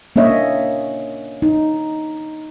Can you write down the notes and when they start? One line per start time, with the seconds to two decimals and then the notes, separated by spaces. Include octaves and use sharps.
0.16 A#3 C#4 D4 C#5 D#5 E5
1.42 D#4